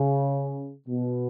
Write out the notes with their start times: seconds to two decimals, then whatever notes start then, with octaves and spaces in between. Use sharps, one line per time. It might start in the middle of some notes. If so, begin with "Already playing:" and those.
Already playing: C#3
0.88 B2